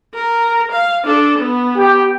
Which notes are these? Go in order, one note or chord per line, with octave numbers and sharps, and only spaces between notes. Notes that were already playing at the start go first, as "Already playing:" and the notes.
A#4
F5
D4 A4
B3
G4